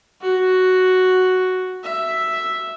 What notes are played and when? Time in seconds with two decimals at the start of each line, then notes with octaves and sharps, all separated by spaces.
0.22 F#4
1.84 E5